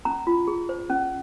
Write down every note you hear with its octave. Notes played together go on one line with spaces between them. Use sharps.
C#4 A#5
F4
G#4
C5
C#4